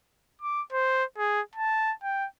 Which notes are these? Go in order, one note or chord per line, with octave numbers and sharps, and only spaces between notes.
D6
C5
G#4
A5
G5